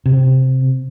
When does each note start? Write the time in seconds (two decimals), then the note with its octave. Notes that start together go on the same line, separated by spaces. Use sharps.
0.06 C3